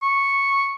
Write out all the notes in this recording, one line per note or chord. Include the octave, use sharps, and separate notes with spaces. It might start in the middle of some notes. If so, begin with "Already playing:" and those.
C#6